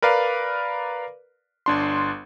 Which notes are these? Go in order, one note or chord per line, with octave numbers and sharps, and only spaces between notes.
A#4 B4 D5 F5
G1 D4 C6